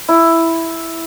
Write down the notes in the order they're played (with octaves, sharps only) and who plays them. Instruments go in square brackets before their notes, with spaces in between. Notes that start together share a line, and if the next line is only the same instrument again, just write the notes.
[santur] E4